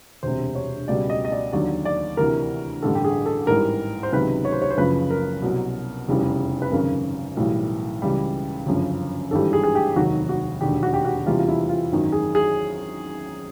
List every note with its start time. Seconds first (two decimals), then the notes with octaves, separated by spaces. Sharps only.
0.23 E1 D2 C3 C5
0.55 C#5
0.88 C#2 B2 G3 D5
1.10 D#5
1.25 D#5
1.32 D5
1.52 D#2 D3 F#3 D5
1.85 D5
2.17 D2 C3 E3 A#4
2.82 A1 G2 D3 G3 A4
2.95 G4
3.04 G#4
3.26 A4
3.47 A1 G#2 E3 G3 A#4
4.03 C5
4.12 C#2 C3 D#3 F#3 B4
4.45 C#5
4.52 C5
4.62 C#5
4.71 C5
4.77 F#1 F#2 C#3 F3 B4
5.10 A#4
5.42 C2 B2 F#3
6.08 F1 E2 C#3 E3 G3
6.62 B4
6.71 G#1 F#2 C#3 A#4
7.37 B1 A2 E3 G3
8.02 C#2 C#3 E3 G3
8.66 G1 F#2 C#3 F3
9.31 G#1 G2 E3 G3 A4
9.53 G#4
9.64 G#4
9.75 G4
9.96 F1 D#2 D#3 F#3 F#4
10.29 F#4
10.61 E1 D#2 D3 G4
10.83 F#4
10.94 G4
11.05 F#4
11.26 E2 C3 E3 G3 F4
11.39 F4
11.48 E4
11.69 F4
11.92 G#1 F#2 D#3 F#3
12.12 G#4
12.35 G#4